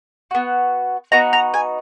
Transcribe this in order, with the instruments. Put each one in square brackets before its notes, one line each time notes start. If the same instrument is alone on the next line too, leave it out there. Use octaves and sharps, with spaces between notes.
[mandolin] B3 F#4
B3 D#4 F#4 A#5
A#5
G#5